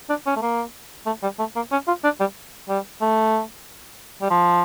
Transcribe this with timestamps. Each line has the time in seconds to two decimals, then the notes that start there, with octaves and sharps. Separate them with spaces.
0.10 D4
0.27 C#4
0.36 A3
0.42 A#3
1.07 A3
1.23 G3
1.39 A3
1.56 A#3
1.72 C#4
1.88 F4
2.04 D4
2.20 G3
2.69 G3
3.02 A3
4.22 G3
4.31 F3